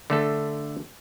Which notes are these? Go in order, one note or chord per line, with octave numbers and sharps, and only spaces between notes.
D3 A3 A4